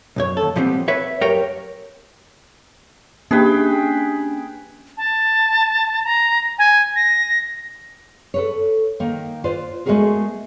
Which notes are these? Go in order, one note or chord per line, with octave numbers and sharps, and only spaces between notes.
B1 F#2 C#5
D#2 A4
A#2 F3 G3 B3 C4
B4 C#5 E5
F#2 G4 A#4 C#5 G5
A#3 C#4 D4 G4 G#4 B4 G5
A5
A#5
G#5
A#6
A4 B4 C#5
D#3 A#3
F4 B4 C5 D5
G#3 A3 B3 F#4 G#4 A#4